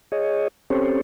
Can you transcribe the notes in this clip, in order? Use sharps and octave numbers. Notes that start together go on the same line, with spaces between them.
G#4 C#5 D#5
C4 C#4 G4 A4 C5 C#5